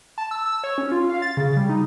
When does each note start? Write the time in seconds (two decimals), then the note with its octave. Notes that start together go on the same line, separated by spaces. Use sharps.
0.18 A5
0.31 E6
0.46 E6
0.64 C#5
0.78 C#4
0.92 F4
1.09 F5
1.22 A6
1.37 C#3
1.57 G3
1.69 D#4